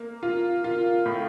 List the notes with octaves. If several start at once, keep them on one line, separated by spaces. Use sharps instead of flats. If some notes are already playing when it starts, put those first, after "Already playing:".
Already playing: A#3
F4
F4
A2